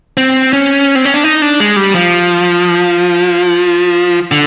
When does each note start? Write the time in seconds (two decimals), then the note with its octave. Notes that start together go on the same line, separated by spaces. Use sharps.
0.17 C4
0.53 C#4
0.95 C4
1.05 C#4
1.14 D4
1.24 D#4
1.42 D4
1.60 G#3
1.77 G3
1.95 F3
4.32 D3